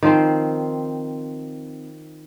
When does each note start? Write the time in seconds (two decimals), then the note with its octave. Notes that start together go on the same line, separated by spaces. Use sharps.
0.03 D#3 F3 C4